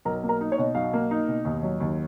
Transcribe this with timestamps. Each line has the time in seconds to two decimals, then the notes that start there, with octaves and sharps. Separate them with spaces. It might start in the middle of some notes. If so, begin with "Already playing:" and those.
0.05 B1 A#4
0.23 A#3
0.29 A#4
0.41 D#4
0.52 C#5
0.58 B2
0.75 B1 F5
0.93 A#3
1.11 D#4
1.28 B2
1.45 D#2
1.63 F#3
1.80 D#2